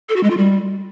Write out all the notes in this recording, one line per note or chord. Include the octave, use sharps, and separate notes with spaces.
A4
F#4
G#3
F4
G3